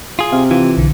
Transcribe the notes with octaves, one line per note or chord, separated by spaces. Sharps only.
F4 G#4
C3 F5
E3 F4
B1 D3